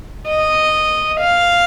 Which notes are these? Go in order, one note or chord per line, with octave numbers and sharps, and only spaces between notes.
D#5
F5